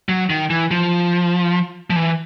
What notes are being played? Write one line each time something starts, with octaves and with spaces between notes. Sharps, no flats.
F#3
D#3
E3
F3
F3
E3